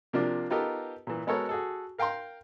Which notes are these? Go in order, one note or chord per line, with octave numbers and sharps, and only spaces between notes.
C3 F3 A#3 D4 F4
B3 D#4 F4 G4 A4 A#4
A#2 E3
G#3 B3 F#4 A4 A#4 C#5
F#4 G#4 A4
A#4 F5 G5 A#5 C6